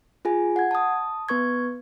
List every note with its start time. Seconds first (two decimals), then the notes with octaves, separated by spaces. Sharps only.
0.25 F4 G#4 G#5
0.56 F#5 G#6
0.71 A5 D#6
1.29 B3 B4 C#6 G#6